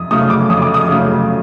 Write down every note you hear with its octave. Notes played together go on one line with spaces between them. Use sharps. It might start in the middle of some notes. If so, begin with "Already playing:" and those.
Already playing: F2 D#6
C#3 F#3 A3 D#6
D6
F2 D#6
D6
D#6
C#3 F#3 A3